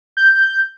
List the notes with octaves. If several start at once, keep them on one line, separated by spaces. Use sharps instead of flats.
G6